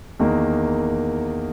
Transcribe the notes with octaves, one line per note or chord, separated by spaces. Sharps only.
E2 D#3 A#3